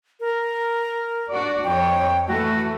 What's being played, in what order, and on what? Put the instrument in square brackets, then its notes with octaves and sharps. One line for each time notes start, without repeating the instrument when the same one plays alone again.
[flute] A#4
[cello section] D4 F#4 D5
[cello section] F2 C#5 [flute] G5
[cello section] E3 A3 A4 [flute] F#4